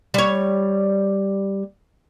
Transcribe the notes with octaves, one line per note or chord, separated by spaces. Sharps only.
G3 C#5